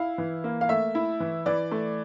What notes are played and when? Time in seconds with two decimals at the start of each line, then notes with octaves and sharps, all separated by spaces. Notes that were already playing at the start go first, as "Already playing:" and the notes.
Already playing: E4 F5
0.18 E3
0.44 A#3
0.61 F5
0.69 A3 E5
0.95 E4
1.20 E3
1.46 E3 D5
1.72 A3